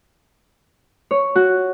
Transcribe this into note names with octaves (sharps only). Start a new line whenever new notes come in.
C#5
F#4